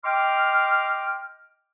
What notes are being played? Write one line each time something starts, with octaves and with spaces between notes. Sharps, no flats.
D#5 G5 C6 D6 F6